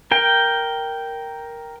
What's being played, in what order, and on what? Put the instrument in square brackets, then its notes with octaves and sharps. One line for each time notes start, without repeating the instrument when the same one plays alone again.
[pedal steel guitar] A#4 G5